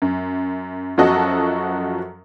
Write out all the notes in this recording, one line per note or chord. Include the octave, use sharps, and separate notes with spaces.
F#2
F#2 F3 F#3 F#4 A4 D#5